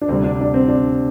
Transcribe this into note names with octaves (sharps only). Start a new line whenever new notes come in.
D4
D2 C3 G3 C4
D4
D4
C4
D4